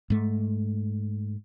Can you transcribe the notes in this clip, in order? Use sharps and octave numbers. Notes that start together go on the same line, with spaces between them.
G#2 A3